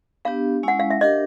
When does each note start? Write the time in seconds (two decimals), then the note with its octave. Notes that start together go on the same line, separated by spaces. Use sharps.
0.25 B3 D4 G4 F5
0.63 G#3 C#4 E4 F#5
0.80 F5
0.90 E5
1.01 D4 G4 A#4 D#5